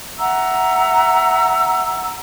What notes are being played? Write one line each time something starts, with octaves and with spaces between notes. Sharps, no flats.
E5 F#5 A#5 E6